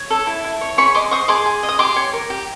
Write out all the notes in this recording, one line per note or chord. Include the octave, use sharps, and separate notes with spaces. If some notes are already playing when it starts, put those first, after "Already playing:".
Already playing: C#5
A4
E4
E4
C#5
G#4 B5 C#6
D#5 C6 D6
C5 C#6 D#6
G#4 C6 D6
G#4
D#5
D#6
G4 C6 D6
C#5
A#4
G4